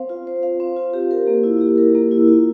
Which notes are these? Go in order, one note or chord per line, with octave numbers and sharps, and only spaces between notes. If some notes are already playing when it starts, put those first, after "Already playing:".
Already playing: C4 C5 F5
F4
C5
F5
C4
F4
G4
A#4
A#3
E4
G4
A#4
A#3
E4
F4